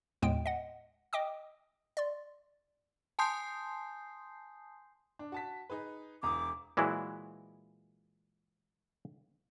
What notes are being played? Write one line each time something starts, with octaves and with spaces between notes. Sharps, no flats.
D#2 A2 G#3 B3 G5 D7
D#5 F#5
D#5 G5 D6 D#6
D5 C6
G#5 A5 C6 D#6 G6 C7
D4
F#4 A5 B6
D#4 G#4 B4
E1 A#5 D6 D#6
A#2 E3 F#3 G#3 E4